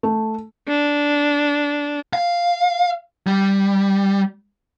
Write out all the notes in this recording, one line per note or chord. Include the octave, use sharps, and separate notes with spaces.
A3
D4
F5
G3